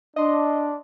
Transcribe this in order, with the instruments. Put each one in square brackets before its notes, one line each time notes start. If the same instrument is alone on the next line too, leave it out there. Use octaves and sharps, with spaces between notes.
[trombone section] D4 [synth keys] D#5 C6